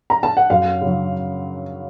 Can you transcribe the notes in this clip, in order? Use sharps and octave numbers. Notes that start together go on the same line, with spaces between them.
A#5
A5
F#5
F#2 F5
C#3 F#3